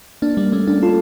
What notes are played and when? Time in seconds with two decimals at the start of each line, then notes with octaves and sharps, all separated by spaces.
0.22 A#3 D4
0.37 G3 A#3
0.52 A3 C#4
0.67 A#3 D4
0.83 F4 A4